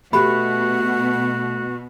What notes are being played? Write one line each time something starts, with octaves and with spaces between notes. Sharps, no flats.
B2 A3 F#4 G4 B5